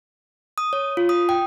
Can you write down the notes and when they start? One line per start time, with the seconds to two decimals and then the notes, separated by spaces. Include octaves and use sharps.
0.58 D#6
0.73 C#5
0.97 F4
1.09 D#6
1.29 G5